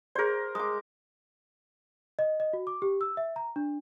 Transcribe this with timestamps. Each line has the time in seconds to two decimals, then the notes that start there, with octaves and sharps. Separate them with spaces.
0.15 G#4 A#4 C5 D5
0.55 G#3 D6 D#6
2.19 D#5
2.40 D#5
2.53 F#4
2.67 D6
2.82 G4
3.01 E6
3.17 E5
3.36 A#5
3.56 D4